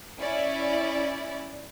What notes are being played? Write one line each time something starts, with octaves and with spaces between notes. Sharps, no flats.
C#4 E4 D5